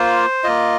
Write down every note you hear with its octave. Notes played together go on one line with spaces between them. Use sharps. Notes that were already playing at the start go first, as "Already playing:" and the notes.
Already playing: A#3 F4 C5
A#3 F4 D#5